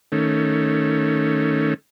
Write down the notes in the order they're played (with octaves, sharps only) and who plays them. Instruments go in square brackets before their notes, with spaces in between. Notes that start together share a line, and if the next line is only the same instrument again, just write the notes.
[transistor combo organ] D#3 A3 C#4